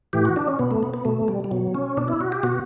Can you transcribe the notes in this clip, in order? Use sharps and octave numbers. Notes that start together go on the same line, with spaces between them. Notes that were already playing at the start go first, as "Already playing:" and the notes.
A2 E3 G4
F#4
D4
C#4
B2 B3
A3
B3
B3
B2 A3
G3
G3
B2 F#3
C#4
B2 D4
E4
F#4
G4
B2 F#4